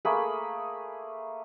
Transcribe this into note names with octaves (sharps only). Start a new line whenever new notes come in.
A3 A#3 G#4 B5